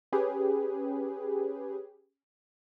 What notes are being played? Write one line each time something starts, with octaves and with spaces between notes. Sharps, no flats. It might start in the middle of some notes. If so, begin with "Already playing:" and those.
C#4 G4 G#4 B4